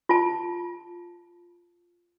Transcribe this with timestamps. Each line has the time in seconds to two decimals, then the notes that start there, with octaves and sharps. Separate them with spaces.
0.09 F4 A5